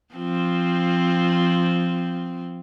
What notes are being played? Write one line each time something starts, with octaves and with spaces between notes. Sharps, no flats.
F3 C4